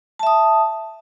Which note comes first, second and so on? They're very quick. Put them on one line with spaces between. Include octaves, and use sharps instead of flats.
A5 E5 D#6